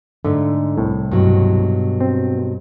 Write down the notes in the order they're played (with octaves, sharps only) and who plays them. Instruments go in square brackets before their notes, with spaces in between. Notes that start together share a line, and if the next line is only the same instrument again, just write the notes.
[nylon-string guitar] G#2 A3 [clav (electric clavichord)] D3
[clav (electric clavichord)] C2 A2
[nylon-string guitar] G2 B2 F#3
[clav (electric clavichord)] C4